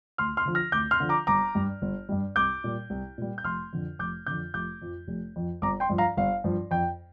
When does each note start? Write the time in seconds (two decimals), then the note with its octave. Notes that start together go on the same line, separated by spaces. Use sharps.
0.18 D2 C6 F6
0.37 C6 F6
0.45 D3 F3
0.55 F6 A#6
0.72 D2 D6 G6
0.91 C6 F6
1.00 D3 F3
1.09 A#5 D6
1.27 G1 A#5 D6
1.55 G2 G3
1.82 G1
2.09 G2 G3
2.36 C2 D6 G6
2.64 A#2 G3
2.90 C2
3.18 A#2 G3
3.38 G6
3.44 F1 C6 F6
3.73 F2 D3
3.99 F1 D6 G6
4.26 F2 D3 D6 G6
4.54 F1 D6 G6
4.82 F2 F3
5.08 F1
5.36 F2 F3
5.62 G1 A#5 D6
5.80 G5 C6
5.89 G2 F3
5.98 F5 A#5
6.17 G1 F5
6.44 G2 F3
6.71 F2 G5